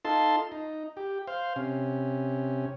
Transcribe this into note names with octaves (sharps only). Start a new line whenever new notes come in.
D#4 F4 A4 A5 C6
D#4
G4
C5 F5
C3 C#4